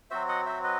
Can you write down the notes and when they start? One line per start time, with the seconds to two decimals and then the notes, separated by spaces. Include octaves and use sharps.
0.10 F#3 C4 F#4 C5 E5
0.28 D#5 F#5
0.46 C5 E5
0.64 B4 D#5